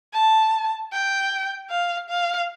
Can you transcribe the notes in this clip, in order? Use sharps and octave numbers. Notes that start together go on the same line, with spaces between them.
A5
G5
F5
F5